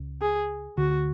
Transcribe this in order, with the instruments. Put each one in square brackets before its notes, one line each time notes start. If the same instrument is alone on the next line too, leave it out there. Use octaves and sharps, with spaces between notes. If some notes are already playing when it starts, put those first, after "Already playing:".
Already playing: [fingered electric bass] C#2 C#3
[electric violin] G#4
[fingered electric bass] D2 D3 [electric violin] F#4